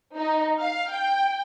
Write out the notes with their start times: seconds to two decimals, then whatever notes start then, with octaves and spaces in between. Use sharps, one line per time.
0.15 D#4
0.60 F5
0.91 G5